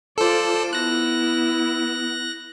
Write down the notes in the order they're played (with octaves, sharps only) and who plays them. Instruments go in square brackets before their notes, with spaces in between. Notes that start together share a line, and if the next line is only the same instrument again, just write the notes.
[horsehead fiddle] F4 D5 [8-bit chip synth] A4 C5
[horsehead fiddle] B3 E4 [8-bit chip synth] F#6 A#6